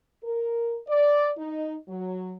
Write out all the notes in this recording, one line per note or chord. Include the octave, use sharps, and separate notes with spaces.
A#4
D5
D#4
F#3